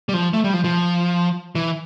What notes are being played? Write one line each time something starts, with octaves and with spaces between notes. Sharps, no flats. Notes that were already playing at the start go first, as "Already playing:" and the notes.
G3
F3
A3
G3
F3
F3
E3